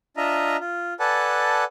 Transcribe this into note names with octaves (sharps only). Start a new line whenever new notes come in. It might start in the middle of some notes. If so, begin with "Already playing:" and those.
D4 F4 D#5 E5 A#5
F4
A4 B4 D5 F#5 G#5 A5